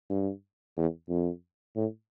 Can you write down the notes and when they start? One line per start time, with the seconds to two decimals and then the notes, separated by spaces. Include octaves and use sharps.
0.10 G2
0.77 E2
1.09 F2
1.76 A2